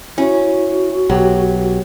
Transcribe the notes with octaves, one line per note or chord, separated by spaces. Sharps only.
C#4 E4 F#4 C#5
B1 F#3 G4 C#5 G5